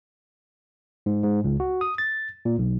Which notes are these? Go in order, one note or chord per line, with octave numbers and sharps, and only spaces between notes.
G#2
G#2
C#2
F#4
D#6
A6
A#2
B1